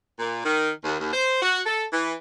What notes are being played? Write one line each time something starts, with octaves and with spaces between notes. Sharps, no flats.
A#2
D#3
D#2
D#2
C5
F#4
A4
E3